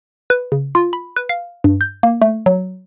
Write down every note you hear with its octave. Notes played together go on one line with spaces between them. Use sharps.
B4
C#3
F4
B5
B4
F5
G2
G6
A#3
A3
F#3